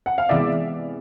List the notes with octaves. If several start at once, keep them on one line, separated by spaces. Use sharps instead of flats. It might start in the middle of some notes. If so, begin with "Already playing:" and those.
F#5
F5
C3 E3 G#3 B3 D5 E5